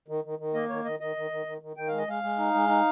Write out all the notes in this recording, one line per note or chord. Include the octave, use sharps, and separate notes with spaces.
D#3
D#3
D#3
A#3 D#5
D#3 C#5
D#3 D#5
D#3 D#5
D#3
D#3
D#3
D#3
D#3 G5
G#3 F5
D#5
G#3 F5
G#3
D#4
G#3
D#4